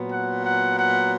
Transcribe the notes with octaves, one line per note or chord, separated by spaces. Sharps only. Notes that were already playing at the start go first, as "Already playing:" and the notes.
Already playing: A#2 F#3 B3
F#5
F#5
F#5